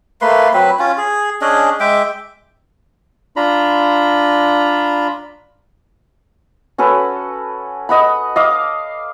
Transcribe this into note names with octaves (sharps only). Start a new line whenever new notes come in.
A3 A#3 B4 C6
F#3 C4 B4
C#4 F4
G#4
C#4 D4 G#4 D#5
G#3 E5 G5 D6
D4 F4 A#5 B5
C#4 F#4 A4 B4
D#5 F#5 B5
D#5 F5 D6